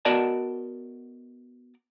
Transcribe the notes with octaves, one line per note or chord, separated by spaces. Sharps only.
B3 F#4 A#4 D5 D#5 A5